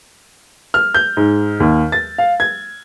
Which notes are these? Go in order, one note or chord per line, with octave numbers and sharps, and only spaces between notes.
F6
G6
G#2
D#2
A6
F5
G#6